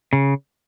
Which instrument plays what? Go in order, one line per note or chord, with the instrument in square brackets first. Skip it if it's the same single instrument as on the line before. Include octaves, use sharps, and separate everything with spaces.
[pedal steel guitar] C#3